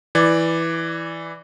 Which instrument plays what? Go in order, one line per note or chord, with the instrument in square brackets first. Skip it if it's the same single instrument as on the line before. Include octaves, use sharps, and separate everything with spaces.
[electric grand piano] E3 D5